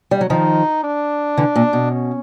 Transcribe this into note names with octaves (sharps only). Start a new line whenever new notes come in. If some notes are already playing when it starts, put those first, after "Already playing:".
G3
F#3
D#3 F3 D#4
D4
D3 E3
A#2
B2
C#4